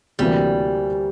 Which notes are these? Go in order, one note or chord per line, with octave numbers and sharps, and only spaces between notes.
D2 C3 E3 G3 A#3